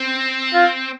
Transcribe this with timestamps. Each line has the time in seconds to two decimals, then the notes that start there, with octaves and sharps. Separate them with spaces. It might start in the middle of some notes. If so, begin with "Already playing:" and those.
Already playing: C4
0.54 F4